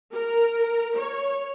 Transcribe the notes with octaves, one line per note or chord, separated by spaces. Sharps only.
A#4
C#5